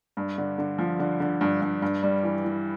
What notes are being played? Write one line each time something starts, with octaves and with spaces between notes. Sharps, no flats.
G2
D3
D3
F3
D3
D3
G2
G2
G2
G3
E3
E3